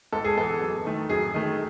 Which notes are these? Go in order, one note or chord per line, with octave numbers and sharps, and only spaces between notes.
G#2 A4
G#4
E3 B3 A4
F#2
D#3 A3
F#2 G#4
D#3 A3